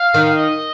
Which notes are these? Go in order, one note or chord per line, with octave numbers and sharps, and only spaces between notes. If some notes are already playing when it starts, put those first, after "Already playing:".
Already playing: F5
D#3
D#5